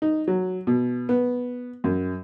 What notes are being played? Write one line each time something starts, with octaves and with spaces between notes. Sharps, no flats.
D#4
F#3
B2
B3
F#2